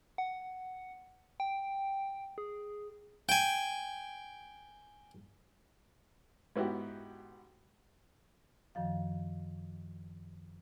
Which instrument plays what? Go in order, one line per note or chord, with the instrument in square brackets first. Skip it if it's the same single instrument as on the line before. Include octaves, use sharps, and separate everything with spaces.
[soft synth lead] F#5
G5
G#4
[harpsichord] G5 G#5
[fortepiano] G#2 B3 E4 F#4 G4
[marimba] F#2 D#3 F3 F5